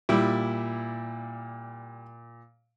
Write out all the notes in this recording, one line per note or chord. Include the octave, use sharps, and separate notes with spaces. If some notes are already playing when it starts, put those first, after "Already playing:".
A#2 G3 E4